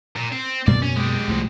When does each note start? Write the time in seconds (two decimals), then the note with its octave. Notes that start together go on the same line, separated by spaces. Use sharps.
0.16 A#2
0.32 C4
0.67 F#2 B2 A#3 D5
0.83 C#4
0.97 G#3 G4
1.27 C2 A2 F3